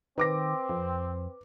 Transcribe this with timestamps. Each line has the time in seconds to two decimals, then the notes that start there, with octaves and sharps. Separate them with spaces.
0.18 D#3 C4 B4 D6 A#6
0.69 F2